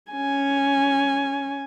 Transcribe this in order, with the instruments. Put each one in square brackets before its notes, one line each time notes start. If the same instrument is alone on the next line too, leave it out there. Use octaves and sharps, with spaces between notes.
[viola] C#4 G#5